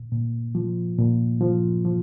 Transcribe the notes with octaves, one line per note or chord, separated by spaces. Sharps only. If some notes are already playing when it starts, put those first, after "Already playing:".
Already playing: A#2
A#2
F3
A#2
F3
F3